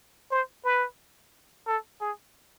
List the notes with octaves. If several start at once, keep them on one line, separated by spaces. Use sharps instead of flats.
C5
B4
A4
G#4